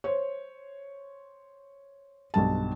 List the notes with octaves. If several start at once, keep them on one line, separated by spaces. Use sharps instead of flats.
C5 C#5
B1 G2 A5